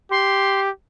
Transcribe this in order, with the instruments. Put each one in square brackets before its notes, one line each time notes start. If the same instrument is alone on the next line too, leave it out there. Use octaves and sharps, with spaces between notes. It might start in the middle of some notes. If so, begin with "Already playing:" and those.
[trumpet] G4 [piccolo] C6